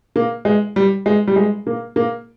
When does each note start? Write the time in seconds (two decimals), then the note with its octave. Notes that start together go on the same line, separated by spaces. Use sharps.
0.16 A#3
0.45 G#3
0.76 G3
1.06 G#3
1.27 G3
1.36 G#3
1.67 A#3
1.96 A#3